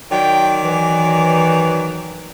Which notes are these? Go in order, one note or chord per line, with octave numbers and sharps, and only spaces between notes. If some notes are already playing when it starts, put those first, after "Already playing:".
D#3 F#3 D5 G5
E3